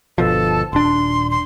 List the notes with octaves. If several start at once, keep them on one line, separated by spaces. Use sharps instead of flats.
G1 B2 F3 A4
D#1 D4 C6
C6